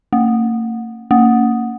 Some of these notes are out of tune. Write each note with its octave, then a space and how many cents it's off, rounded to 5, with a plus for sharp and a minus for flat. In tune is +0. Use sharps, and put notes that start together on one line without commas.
A#3 -45
A#3 -30